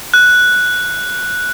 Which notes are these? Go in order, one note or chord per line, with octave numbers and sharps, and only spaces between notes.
F#6